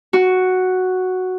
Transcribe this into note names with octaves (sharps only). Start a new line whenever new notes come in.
F#4